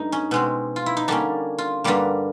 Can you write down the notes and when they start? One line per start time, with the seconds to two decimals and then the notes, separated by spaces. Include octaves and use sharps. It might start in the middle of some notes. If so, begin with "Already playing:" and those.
Already playing: G2 A3 D#4
0.12 C#4
0.31 B2 G#3 C4
0.76 F4
0.86 E4
0.97 D#4
1.08 D3 G3 A#3 C#4 D4
1.58 F4
1.84 G2 D3 G3 A#3